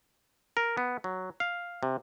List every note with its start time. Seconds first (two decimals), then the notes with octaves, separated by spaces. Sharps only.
0.57 A#4
0.77 B3
1.04 F#3
1.40 F5
1.83 C3